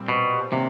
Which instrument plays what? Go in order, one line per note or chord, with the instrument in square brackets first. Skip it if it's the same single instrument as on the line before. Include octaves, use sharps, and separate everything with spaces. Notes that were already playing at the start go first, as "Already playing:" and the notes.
Already playing: [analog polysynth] A#2 G3 C4
[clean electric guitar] B2
[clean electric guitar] C3 [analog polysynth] D#3 F#3 A#3 D4